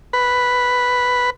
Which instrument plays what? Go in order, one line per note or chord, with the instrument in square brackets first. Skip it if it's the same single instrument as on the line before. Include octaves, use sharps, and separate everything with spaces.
[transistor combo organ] B4